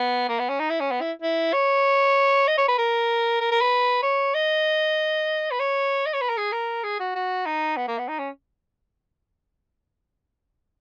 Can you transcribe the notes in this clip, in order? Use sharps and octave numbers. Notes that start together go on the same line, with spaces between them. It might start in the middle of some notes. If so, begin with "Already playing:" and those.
Already playing: B3
A#3
B3
C#4
D#4
E4
C#4
B3
E4
E4
C#5
D#5
C#5
B4
A#4
A#4
A#4
B4
C#5
D#5
B4
C#5
D#5
C#5
B4
A#4
G#4
A#4
G#4
F#4
F#4
D#4
B3
A#3
B3
D#4
C#4